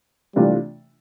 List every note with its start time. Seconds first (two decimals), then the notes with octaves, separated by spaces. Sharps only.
0.35 C3 E3 G3 A3 D4 F4